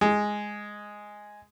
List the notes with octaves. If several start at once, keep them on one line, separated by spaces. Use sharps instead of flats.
G#3